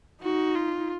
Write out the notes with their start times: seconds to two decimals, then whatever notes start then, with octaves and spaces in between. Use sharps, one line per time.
0.22 D#4 F#4
0.55 F4